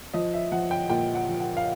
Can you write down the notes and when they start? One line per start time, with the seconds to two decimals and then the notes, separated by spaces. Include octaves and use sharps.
0.14 F3 D#5
0.34 E5
0.52 F3 F#5
0.71 G5
0.89 A#2 G5
1.15 F#5
1.28 F3
1.40 F#5
1.57 F5